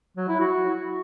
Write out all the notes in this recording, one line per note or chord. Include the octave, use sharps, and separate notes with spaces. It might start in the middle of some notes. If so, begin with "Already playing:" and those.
F#3
E4
F#4